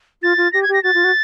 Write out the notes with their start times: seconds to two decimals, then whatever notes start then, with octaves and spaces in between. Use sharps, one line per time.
0.22 F4 A6
0.37 F4
0.53 G4 A#6
0.63 G#6
0.68 G4
0.74 A#6
0.84 F#4 A6
0.94 F4
1.04 F#4